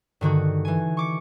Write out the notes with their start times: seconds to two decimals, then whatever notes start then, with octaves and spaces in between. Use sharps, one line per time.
0.21 G2 D3 D#3 F#4
0.65 E3 G#5
0.97 C#6 D6 C#7